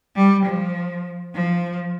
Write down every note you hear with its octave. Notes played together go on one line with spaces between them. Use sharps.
G3
F3
F3